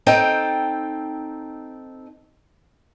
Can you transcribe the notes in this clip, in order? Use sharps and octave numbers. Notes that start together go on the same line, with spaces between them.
C4 D#4 A4 G5